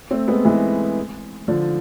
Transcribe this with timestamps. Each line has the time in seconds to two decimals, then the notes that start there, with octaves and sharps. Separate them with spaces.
0.11 A3 C4
0.28 G#3 B3
0.45 E3 G#3
1.48 D3 F3